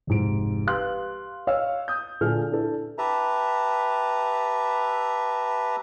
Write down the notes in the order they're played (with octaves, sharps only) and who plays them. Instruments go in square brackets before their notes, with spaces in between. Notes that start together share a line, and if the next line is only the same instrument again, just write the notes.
[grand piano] F1 G#2 D7
G4 B4 F5 C6 F#6
C#5 D#5 F5 E6
D#6 G6
A#2 D3 G#4 A4 G#5 F6
D4 E4 A4
[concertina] G4 B4 E5 A5 A#5